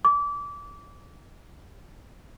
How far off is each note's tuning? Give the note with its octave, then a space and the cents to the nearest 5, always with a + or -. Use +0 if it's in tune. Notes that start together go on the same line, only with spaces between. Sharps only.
D6 -25